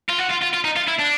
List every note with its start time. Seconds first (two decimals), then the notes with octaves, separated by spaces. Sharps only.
0.10 F4
0.21 F#4
0.31 F4
0.43 F4
0.54 F4
0.65 D#4
0.76 F4
0.87 E4
0.99 D4